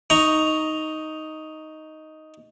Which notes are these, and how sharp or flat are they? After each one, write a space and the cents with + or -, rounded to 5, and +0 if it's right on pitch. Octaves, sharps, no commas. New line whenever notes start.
D#4 +5 A#5 +0 C#6 +5